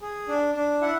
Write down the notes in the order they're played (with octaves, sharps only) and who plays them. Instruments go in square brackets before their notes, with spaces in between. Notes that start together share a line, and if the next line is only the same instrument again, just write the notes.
[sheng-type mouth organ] G#4
D4
D4
E4 F#5